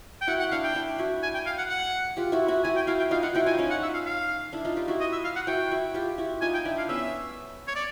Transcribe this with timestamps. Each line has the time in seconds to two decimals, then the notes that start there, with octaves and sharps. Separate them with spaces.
0.21 G5
0.27 E4 F#4 F#5
0.40 F#5
0.51 D4 E4 F5
0.64 G5
0.75 D4 E4
0.98 E4 F#4
1.23 G#5
1.34 G5
1.46 F5
1.58 F#5
1.70 F#5
2.17 F4 G4
2.32 E4 F#4
2.48 E4 F#4
2.64 E4 F#4 G#5
2.76 G5
2.87 E4 F#4 F5
2.99 G5
3.11 D#4 F4 F5
3.23 D#4 F4 F#5
3.35 E4 F#4 G5
3.46 D#4 F4 G#5
3.58 C#4 D#4
3.70 F#5
3.83 E5
3.94 F5
4.06 F5
4.53 D4 E4
4.65 D#4 F4
4.76 F4 G4
4.88 E4 F#4
5.00 D#5
5.12 E5
5.24 F5
5.36 F#5
5.47 E4 F#4 G5
5.71 E4 F#4
5.94 F4 G4
6.18 E4 F#4
6.41 D#4 F4 G#5
6.54 G5
6.65 D4 E4
6.78 F5
6.89 B3 C#4 E5
7.68 C#5
7.75 D5